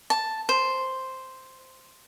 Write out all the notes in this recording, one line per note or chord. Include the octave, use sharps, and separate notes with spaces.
A5
C5